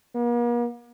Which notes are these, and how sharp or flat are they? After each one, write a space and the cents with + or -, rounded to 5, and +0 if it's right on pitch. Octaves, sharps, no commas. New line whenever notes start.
A#3 +45